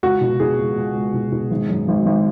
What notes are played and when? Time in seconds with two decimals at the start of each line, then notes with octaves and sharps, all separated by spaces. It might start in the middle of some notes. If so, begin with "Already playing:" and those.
0.03 C#2 F#4
0.21 B2
0.40 B2 G#4
0.58 C#2
0.76 C#2
0.95 C#2
1.14 B2
1.32 B2
1.51 G#1
1.69 F#2
1.88 G#1
2.06 G#1